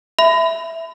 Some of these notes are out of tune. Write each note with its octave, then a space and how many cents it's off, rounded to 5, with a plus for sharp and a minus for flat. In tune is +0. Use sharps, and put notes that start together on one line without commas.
E5 +0 B5 +30